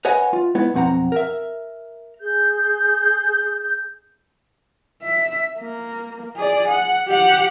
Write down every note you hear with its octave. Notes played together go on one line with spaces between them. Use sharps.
B4 C#5 D#5 E5 F#5 G#5
F4
G#3 B3 E4
B1 F2 C4 F#5 A#5
A#4 E5
G#4 G6
E5
A#3
G#4 D5
F#5
G4 F#5